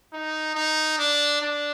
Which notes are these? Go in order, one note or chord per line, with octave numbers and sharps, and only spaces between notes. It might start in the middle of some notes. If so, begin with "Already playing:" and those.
D#4
D#4
D4
D4